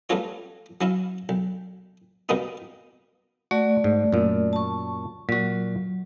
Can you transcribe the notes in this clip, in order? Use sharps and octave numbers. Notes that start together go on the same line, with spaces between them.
G3 A3 B3 C#4 F4 C#5
F#3 C#4 E4 F5
B1
B2 G3 A#3 B3 C#4 D#4
A3 F#4 D5
G#2
F#2 A#2
A5 C#6
A#2 F#3 F#4